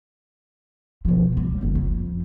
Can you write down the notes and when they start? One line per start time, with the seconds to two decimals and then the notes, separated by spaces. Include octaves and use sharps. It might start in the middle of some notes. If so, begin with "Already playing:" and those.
1.05 B2 F3
1.37 G3
1.61 F#1 C#4
1.75 F2